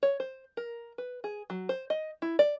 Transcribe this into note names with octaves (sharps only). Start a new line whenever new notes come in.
C#5
C5
A#4
B4
G#4
F#3
C5
D#5
E4
D5